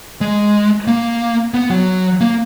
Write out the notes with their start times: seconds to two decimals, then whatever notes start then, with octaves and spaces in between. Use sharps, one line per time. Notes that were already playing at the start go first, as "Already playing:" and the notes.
0.21 G#3
0.87 A#3
1.54 B3
1.71 F#3
2.21 A#3